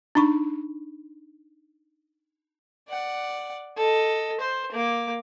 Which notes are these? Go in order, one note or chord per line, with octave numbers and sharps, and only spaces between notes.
D4 D#4 B5 C#6
D5 F#5
A4 D#5
C5
A#3 D6